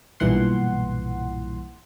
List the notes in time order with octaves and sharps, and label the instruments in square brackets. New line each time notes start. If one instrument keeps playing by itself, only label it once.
[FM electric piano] B1 G2 A#2 E3 F#5 C6